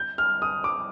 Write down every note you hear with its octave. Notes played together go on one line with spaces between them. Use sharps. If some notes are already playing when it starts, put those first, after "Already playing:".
Already playing: G6
F6
D#6
D6